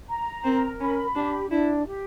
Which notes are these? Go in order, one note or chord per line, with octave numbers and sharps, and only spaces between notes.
A#5
C4 A#4
C#4 B5
D4 G4
D4 E4
G4